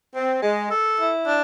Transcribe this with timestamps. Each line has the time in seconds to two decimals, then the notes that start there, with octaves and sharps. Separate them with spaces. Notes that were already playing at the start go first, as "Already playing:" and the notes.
0.16 C4
0.43 G#3
0.71 A4
1.00 E4
1.28 D4